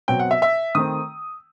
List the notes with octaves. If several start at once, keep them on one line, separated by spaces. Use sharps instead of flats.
B2 F#3 C4 G5
F#5
E5
E5
D#3 A3 C4 D#6